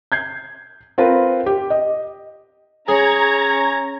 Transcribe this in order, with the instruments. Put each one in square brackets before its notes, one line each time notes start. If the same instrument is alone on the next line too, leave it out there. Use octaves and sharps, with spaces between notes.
[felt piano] G6 G#6 C7
C4 F4 A#4 B4
G4
D#5
[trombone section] C#4 [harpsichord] G#4 [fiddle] C#5 [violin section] A#5 G#6